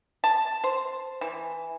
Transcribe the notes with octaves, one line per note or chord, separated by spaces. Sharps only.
A5
C5
E3